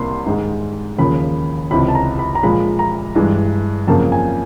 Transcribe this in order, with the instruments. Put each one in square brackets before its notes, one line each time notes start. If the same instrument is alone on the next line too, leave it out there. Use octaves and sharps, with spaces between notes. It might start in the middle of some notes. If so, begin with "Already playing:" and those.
Already playing: [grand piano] C2 C3 A#3 B5 C6
G#2 D#3 G#3
D#2 C#3 F3 A#3 B5
C#2 C3 E3 B5
A5
A#5
B5
A#5
A#2 F3 G#3 B5
A#5
G2 E3 G#3
F2 C#3 F#3 A#3 A5
G#5